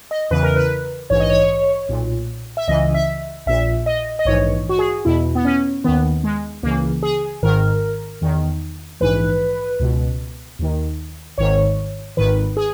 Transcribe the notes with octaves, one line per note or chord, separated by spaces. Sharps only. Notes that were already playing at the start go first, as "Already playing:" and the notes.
D#5
E2 C#3 E3 B4
A#4
B4
A#1 G#2 E3 C#5
D#5
C#5
B1 A#2
E5
C#2 C#3 E3 D#5
E5
A#1 A#2 E5
D#5
D#5
A#1 G#2 E3 C#5
F#4
G#4
E2 B2 E4
B3
C#4
D#2 D#3 B3
G#3
C#2 C#3 E3 A#3
G#4
G#1 G#2 D#3 A#4
E2 D#3
A#1 G#2 E3 B4
C#2 B2
D#2 D#3
G#1 G#2 D#3 C#5
G#1 G#2 D#3 B4
G#4